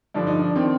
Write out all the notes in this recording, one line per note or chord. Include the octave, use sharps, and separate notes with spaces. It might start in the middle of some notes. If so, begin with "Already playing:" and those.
G2 D3 F3 D4
D#4
D4
D#3 C4